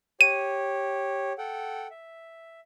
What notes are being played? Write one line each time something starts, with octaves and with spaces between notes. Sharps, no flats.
G4 C#5 D#7
A4 F#5 G5
E5